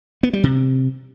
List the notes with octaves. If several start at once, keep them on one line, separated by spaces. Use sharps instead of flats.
B3
G3
C3